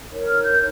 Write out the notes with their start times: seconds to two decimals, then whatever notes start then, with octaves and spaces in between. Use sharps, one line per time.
0.09 D#4 A#4 C#5
0.27 F6
0.44 G6